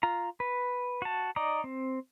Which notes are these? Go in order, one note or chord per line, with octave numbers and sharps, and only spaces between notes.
F4 A#5
B4
F#4 A5
D#4 D5 D#5 A#5
C4